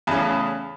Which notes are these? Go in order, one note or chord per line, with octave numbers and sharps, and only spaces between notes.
E2 A2 C#3